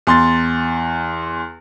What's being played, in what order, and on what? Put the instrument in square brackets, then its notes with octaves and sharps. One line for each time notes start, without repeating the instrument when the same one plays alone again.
[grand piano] E2 C6 A6